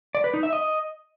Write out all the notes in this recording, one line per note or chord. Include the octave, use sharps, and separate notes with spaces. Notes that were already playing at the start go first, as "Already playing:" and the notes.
D5
B4
D#4
E5
D#5